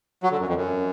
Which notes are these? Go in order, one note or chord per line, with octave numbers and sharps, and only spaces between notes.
F#3
D3
F#2
F2
F#2